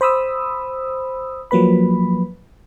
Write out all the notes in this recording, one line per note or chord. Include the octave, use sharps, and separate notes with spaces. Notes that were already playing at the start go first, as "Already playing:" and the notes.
C5 B5 D#6 E6
F3 F#3 A#3 B4 B5